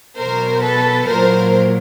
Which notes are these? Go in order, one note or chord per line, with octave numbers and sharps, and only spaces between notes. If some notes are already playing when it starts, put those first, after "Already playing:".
B2 F#3 A#4 C5
A4 B4
A#2 F#3 A#4 C5